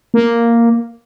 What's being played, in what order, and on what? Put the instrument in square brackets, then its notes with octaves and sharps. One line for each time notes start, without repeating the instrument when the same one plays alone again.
[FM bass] A#3